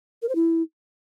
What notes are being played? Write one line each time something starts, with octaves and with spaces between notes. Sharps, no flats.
A#4
C5
E4